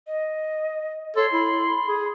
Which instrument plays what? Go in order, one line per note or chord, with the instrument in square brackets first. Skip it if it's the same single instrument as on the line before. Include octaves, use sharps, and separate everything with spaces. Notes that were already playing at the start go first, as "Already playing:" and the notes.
[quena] D#5
[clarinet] A4 [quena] C#5 [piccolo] C6
[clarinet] E4 [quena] B5
[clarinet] G#4